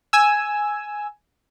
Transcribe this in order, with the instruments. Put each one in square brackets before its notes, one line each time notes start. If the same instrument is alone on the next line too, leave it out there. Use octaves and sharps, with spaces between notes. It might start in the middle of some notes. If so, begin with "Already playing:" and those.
[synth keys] G#5 E6